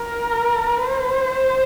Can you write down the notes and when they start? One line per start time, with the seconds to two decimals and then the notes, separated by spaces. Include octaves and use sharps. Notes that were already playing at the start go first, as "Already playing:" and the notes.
Already playing: A#4
0.77 C5